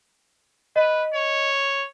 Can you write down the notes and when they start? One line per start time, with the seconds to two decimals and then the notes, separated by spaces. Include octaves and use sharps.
0.76 B4 D#5
1.14 C#5